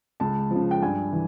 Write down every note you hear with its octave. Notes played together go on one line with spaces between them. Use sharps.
C#2 A5
C#3 F3
G5
G2 G#5
E3